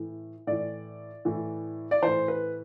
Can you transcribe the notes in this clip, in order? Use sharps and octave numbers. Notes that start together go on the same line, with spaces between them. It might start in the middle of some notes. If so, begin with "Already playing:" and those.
Already playing: A2 E3
A2 E3 D5
A2 E3
D5
A2 E3 C5
B4